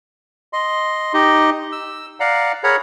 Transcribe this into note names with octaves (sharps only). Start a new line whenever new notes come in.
D#5 C6
D#4 G4 D#5
E6
D5 F5 F#5 A#5
G#4 A#4 C#5 F#5 A#5 B5